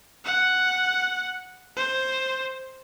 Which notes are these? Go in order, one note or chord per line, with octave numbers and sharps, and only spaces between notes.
F#5
C5